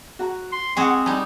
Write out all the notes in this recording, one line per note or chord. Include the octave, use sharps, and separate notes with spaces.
F#4 A#5
C6
G#3 C4 F#4 G#4 F#5 G5
G3 D#4 G#5 B5